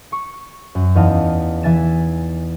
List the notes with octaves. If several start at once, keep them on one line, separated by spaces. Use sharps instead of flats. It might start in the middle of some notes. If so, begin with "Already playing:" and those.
C#6 C7
F#2
E2 D#4 D#5 F5 A5
E3 E5 G#5 A6 E7